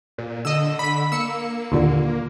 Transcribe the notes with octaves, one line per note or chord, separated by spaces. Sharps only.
A#2
D3 D#5 E6
B5 B6
A#3 E6 C#7
D#2 A#2 D3